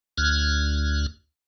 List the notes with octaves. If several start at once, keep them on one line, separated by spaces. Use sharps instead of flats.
D2 F6 F#6 G#6